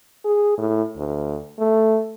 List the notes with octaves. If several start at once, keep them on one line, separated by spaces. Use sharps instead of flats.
G#4
A2
D2
A3